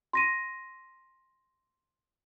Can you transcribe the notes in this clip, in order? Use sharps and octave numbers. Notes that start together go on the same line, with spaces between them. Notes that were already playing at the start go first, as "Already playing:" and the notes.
C6 A#6 D#7